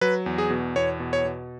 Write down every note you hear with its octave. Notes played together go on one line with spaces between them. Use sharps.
F#3 B4
E2
G#4
B2
E2 C#5
B2
C#5
B2